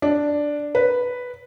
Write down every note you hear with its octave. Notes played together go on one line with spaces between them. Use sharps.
D4
B4